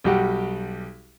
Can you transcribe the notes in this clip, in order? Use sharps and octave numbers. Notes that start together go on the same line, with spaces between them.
B1 G3 F#4 G4 F#5